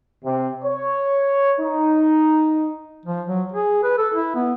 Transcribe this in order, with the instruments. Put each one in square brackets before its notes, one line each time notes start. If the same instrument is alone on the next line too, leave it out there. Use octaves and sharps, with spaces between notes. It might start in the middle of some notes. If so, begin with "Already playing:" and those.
[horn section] C3
C#5
D#4
[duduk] F3
F#3
G#4
B4
A4
E4
B3